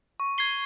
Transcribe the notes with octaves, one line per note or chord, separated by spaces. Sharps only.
C#6
G#6 C7 G7